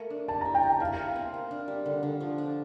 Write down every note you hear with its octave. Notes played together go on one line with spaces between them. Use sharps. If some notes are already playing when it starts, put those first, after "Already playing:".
Already playing: A3 A#3
D4
G4 A5
E4 A#5
G5
G4
E4 F5
E4
C4
A#4
D4
G3
D3
D3
F3
D4